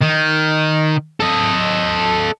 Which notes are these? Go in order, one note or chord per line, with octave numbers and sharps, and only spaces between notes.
D#3
A4 D#5